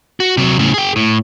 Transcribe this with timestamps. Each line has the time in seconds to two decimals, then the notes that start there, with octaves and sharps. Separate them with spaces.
0.20 F#4
0.37 C3 F#3
0.59 A2 C#3
0.74 G#4 G5
0.96 A2